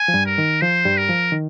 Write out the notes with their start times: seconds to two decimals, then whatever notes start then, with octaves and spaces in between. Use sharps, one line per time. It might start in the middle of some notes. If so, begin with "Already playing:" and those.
Already playing: G#5
0.08 F3
0.14 G2 G3
0.26 A#4
0.38 D#3
0.61 F3 C5
0.85 G2 G3
0.97 A#4
1.09 F3
1.32 D#3